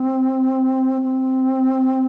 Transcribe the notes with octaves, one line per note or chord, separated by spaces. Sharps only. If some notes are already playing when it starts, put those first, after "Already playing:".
Already playing: C4
C4